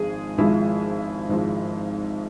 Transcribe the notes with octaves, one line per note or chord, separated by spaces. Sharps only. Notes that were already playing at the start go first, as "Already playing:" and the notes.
Already playing: G#1 G#2 F3 G#3 G#4
G#1 G#2 F3 G#3 E4
G#1 G#2 F3 G#3